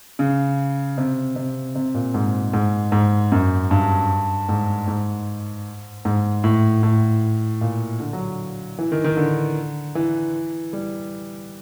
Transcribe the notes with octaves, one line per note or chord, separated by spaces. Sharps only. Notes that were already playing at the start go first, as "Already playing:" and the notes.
C#3
C3
C3
C3
A#2
G#2
G#2
G#2
F#2
G2
G#2
G#2
G#2
A2
A2
A#2
D3
F#3
E3
D#3
D#3
D3
E3
G3